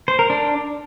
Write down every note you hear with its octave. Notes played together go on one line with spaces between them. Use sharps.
C5
A#4
D4